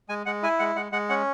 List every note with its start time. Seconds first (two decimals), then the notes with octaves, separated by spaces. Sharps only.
0.09 G#3 G#5
0.26 G#3 F#5
0.43 E4 G#5
0.59 G#3 F#5
0.76 G#3 F#5
0.92 G#3 F#5
1.09 C#4 F#5